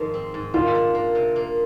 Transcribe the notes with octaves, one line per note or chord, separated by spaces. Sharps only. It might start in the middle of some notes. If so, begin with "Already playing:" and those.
Already playing: G#2 D#3 F3 D#4
C4
G#2
D#3 F4
D4
A#3
C3
A#3